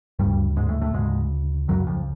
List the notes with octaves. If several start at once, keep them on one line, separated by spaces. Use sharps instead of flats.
G2 C#3 G3
D2
G#2 G#3
A2 A3
A2 A3
D2 G#2 C#3 G#3
C#2 F#2 C#3 F#3
F2 F3